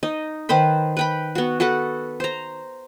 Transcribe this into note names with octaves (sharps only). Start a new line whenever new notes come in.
D#4 D#5
D#3 B4 C5 B5
B4 G5 B5
B3 F#4
F#4 A4 B4 F#5
C5 A#5